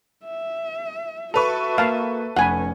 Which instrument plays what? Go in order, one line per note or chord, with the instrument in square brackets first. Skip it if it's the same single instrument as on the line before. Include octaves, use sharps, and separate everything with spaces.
[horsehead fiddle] E5
[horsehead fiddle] F#4 E5 [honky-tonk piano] A4 B4 C#6 [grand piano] F7
[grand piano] A#3 [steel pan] F5 A5
[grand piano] F1 [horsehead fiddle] C#4 [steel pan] F#5 G#5 B5